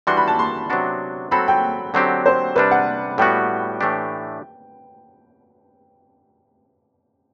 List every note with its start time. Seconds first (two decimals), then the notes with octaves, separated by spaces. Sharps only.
0.07 E3 G3 D4 F#4 C6
0.17 B5
0.27 A5
0.39 C6
0.70 C3 F#3 B3 D4 F#4
1.31 F#3 C4 F#4 A4 B5
1.48 G5
1.94 D3 F#3 C4 G4
2.26 C5
2.56 C3 G3 D4 B4
2.71 F#5
3.18 A2 G3 B3 F#4 G5
3.81 A2 E3 A3 D4 G4